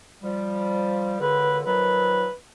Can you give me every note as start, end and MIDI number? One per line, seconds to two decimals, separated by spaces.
0.23 1.17 53
0.23 1.17 55
1.20 1.63 37
1.20 1.63 42
1.20 1.63 50
1.20 1.58 71
1.66 2.26 51
1.66 2.26 53
1.66 2.26 54
1.66 2.34 71